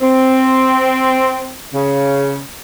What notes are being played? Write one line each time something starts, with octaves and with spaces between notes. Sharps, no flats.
C4
C#3